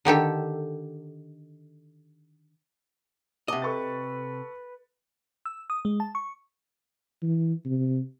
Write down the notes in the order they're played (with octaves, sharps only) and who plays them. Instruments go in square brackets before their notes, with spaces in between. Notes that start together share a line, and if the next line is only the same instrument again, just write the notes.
[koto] D3 D#3 G4 A4
[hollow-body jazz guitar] C3 D#5 [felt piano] F#5 A5 D6
[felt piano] A4 C#6 A6 [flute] B4
[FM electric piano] E6
D#6
G#3
A5
C#6
[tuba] E3
C3